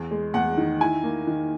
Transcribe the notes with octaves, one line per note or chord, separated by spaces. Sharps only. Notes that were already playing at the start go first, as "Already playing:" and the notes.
Already playing: E2
G#3
E2 F#5
D#3
E4 G#5
A#3
D#3